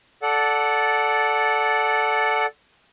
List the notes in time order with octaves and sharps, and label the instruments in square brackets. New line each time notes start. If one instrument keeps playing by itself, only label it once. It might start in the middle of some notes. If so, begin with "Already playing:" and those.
[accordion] A4 D5 F#5